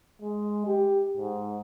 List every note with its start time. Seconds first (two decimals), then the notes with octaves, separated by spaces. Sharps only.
0.22 G#3
0.67 G4
1.17 G#2